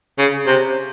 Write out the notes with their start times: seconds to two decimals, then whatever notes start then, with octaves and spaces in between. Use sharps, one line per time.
0.18 C#3
0.47 C3